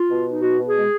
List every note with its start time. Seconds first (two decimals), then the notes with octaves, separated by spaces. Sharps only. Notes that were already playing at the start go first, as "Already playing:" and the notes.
Already playing: F4
0.10 B2
0.26 D#4
0.42 B2 F#4
0.58 B2
0.67 G#4
0.76 G#3